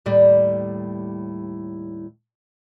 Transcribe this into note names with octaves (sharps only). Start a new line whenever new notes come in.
D#2 A2 G3